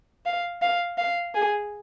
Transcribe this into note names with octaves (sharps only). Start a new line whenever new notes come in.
F5
F5
F5
G#4